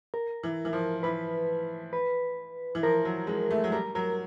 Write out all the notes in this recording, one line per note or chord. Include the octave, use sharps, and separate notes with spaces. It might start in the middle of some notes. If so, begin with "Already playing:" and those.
A#4
E3
E3
F3
E3 B4
B4
E3
F3 A#4
F#3
G#3
A3
F#3
G3 A#4
F#3 A#4